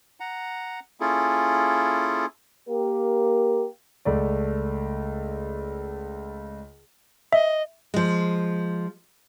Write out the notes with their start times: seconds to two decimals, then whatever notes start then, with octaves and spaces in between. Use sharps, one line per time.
0.20 F#5 A#5
1.00 A#3 C#4 E4 F4 G#4 A4
2.69 A#3 G4 A#4
4.05 C#2 A3 D5
7.33 D#5 E5
7.94 F3 G#3